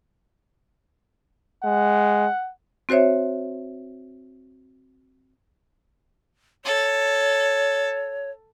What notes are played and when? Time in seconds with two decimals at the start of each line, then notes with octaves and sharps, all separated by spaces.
1.64 G#3 F#5
2.89 C4 F#4 C5 C#5 E5
6.65 A4 C#5